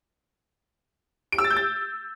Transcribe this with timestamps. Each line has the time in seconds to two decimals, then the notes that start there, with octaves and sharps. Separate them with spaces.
1.32 D7
1.38 E6
1.44 A6
1.50 G6
1.56 A6